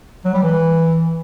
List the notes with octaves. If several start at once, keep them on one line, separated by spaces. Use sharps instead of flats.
F#3
G3
E3